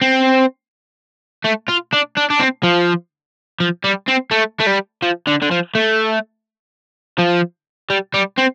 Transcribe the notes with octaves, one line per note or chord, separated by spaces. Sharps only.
C4
A3
F4
D4
D4
D4
C4
F3
F3
G3
C4
A3
A3
G3
F3
D3
D3
F3
A3
F3
G3
G3
C4